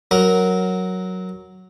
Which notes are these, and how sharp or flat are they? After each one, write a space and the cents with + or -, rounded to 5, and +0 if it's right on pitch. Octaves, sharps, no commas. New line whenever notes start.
F#3 +0 A#4 +0